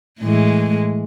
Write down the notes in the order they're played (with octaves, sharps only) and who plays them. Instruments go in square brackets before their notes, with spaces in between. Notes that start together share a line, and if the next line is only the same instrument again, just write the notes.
[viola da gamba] A2 E3 G#3